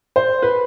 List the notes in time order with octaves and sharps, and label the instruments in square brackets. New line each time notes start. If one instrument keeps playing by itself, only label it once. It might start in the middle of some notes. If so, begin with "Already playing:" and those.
[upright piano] C5
B4